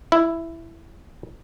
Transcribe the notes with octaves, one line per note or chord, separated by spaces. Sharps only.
E4